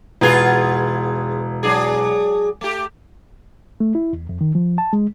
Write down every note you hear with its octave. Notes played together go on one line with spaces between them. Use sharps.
E1 B3 F4 G#4 B4 G#6
F#3 D4 G#4
A3 G4
A3
E4
E2
F2
D#3
F3
A5
G#3